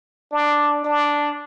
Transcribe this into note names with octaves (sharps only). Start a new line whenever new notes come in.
D4
D4